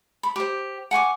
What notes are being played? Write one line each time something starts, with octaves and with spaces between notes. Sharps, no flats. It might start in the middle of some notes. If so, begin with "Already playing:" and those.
B5
G4 C5
F#5 G#5 C#6 D6